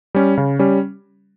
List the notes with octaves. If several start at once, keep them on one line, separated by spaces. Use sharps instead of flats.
G3 C#4
C#3
G3 C#4